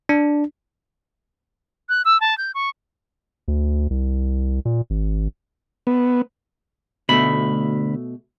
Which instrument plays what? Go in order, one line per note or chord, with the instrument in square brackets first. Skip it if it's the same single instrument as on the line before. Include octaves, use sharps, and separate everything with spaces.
[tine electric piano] D4
[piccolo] F#6
E6
A5
G6
C#6
[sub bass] D2
C2
A#2
G#1
[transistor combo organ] B3
[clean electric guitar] D2 E5 B5 [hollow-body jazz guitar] B2 A3